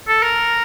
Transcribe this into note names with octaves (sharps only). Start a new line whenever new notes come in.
A4
A#4